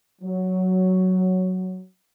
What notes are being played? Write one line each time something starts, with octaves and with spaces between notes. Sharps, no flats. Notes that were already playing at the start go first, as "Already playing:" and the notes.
F#3